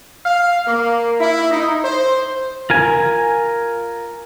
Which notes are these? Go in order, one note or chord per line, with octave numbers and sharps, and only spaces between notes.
F5
A#3
E4
D#4
C5
F4 A#4 G#5